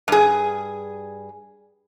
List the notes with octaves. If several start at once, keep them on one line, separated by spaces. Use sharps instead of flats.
G2 G#4